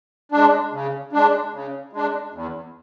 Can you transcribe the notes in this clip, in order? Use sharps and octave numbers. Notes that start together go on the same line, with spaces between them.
G#3 D4
C#3
G#3 D4
C#3
G#3 D4
E2